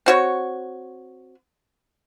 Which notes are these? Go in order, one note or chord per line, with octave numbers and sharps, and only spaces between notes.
C4 F#4 C#5